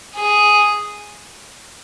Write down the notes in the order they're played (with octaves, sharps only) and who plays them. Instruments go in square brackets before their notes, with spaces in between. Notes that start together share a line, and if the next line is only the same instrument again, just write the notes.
[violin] G#4